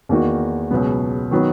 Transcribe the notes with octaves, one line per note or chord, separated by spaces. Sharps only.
E2 D#3 A#3 D#4 F#4
C#2 B2 F#3 B3
D#3 F#3 B3